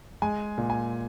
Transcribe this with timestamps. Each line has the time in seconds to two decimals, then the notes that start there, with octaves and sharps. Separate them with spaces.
0.22 G#3 G#5
0.58 A#2
0.70 G#5